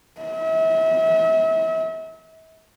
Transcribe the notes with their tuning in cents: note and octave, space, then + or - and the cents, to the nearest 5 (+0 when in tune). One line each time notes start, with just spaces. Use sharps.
E5 -35